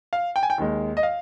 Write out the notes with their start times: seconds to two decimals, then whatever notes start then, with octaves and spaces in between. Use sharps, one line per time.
0.13 F5
0.36 G5
0.43 G#5
0.50 G5
0.58 D#2 D#3 G#3
0.97 D#5
1.03 F5